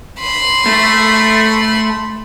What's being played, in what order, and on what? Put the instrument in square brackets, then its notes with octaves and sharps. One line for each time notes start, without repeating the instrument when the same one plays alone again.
[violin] B5 C6
[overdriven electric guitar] A3